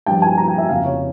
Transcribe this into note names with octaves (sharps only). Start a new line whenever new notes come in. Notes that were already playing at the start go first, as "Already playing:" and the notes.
G2 F3 G5
G#5
A#5
G5
E5
F2 C#3 F3 F5
C#5